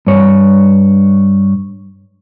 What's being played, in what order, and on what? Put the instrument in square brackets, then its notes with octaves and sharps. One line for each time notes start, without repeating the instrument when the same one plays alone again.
[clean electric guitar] G2 C#5